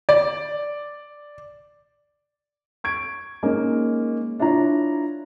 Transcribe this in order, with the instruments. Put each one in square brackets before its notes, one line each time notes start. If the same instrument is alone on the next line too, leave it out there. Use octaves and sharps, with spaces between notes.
[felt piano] D5
[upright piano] C#6 G#6 D7
G#3 A#3 C#4 D#4
D4 E4 F4 C#5 A#5